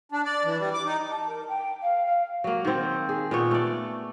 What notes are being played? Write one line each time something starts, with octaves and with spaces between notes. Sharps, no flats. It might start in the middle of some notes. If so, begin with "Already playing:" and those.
D4
D5
E3
G3
D6
D#4
A5
A#4
G5
F5
F5
F#3 A#3
D#3 C4
G#4
A#2 B3 C#5
A3 D5